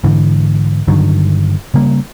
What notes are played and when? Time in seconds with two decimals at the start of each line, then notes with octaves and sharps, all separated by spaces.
0.04 G#2 D3 E3
0.88 G2 D3 D#3 F#3
1.74 C#3 G3 A#3